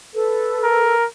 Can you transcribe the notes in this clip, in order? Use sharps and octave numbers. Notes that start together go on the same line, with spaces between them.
A4 B4
A#4